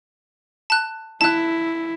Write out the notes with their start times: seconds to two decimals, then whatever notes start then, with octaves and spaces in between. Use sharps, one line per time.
0.70 A5 F#6
1.21 E4 A5 F#6